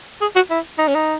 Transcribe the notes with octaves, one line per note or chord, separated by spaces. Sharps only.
G#4
F#4
E4
D#4
C#4
D#4